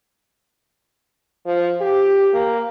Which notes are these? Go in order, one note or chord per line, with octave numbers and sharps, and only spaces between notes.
F3
G4
A#3